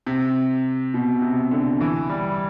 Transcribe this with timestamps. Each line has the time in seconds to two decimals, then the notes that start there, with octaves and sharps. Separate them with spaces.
0.06 C3
0.94 B2
1.22 C3
1.51 D3
1.80 E3
2.10 G3